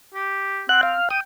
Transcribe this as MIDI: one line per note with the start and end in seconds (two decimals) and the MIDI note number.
0.15 0.64 67
0.69 0.94 60
0.69 0.81 78
0.69 0.81 90
0.83 1.09 77
1.11 1.19 79
1.11 1.20 87